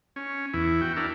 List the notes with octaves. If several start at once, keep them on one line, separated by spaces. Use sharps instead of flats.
C#4
E2 E4
F#4 G5
D4 E4 A#4